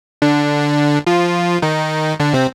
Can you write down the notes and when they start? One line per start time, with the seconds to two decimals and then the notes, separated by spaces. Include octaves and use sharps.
0.22 D3 D4
1.07 F3 F4
1.62 D#3 D#4
2.20 D3 D4
2.33 C3 C4